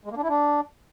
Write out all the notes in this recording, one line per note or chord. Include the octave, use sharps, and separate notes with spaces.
G#3
A#3
D4
E4
D4